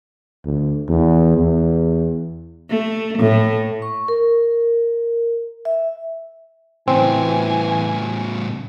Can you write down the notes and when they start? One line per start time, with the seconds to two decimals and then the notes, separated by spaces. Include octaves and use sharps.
0.45 D2
0.89 E2
1.37 E2
2.70 A3
3.19 A2
3.82 C#6
4.08 A#4
5.65 E5
6.88 A2 C#3 E3 C4 G#5